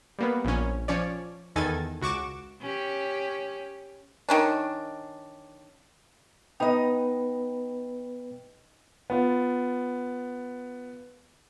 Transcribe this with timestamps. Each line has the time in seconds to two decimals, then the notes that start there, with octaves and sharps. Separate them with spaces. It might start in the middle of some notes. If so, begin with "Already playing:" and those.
0.19 G3 A#3 B3
0.44 A#1 C#4
0.88 F3 C#4 C#5 D5
1.56 E2 D#3 A4 G#5 G#6 A6
2.01 C#2 F#4 C#6 D6 E7
2.61 C#4 G4
4.29 D#3 C#4 D4
6.60 B3 D#4 B4 D#5 G5
9.10 B3 F4